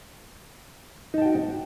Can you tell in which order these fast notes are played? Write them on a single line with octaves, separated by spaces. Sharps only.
D#4 A5 G5 F#4